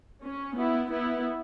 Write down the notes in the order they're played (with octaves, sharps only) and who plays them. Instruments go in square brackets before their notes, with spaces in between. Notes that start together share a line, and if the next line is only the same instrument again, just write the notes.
[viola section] C#4
B3 E4
B3 E4